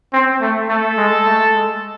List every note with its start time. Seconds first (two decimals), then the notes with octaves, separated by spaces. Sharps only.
0.13 C4
0.41 A3
0.69 A3 A4
0.97 G#3
1.26 A3
1.54 G#3